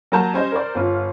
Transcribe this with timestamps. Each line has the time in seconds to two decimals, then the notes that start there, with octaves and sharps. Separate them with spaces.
0.12 F#3 A#3 F#4 A5 A#5 G6
0.33 G3 C#4 C5 D#5
0.52 A#4 C5 D5
0.75 G1 B3 F4